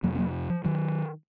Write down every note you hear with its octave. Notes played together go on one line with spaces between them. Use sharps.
F2 C3 F#3 A#3
C4
F#3 A#3
F3
D#3 F#3